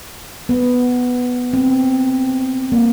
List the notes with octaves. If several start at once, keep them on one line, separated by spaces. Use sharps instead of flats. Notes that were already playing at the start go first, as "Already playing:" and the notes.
B3
C4
A#3